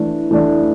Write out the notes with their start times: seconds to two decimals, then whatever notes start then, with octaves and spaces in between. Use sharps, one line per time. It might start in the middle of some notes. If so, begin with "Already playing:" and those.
Already playing: E3 A3 D4
0.31 E3 A3 D4